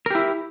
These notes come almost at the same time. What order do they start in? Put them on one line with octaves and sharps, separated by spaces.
A#4 G4 E4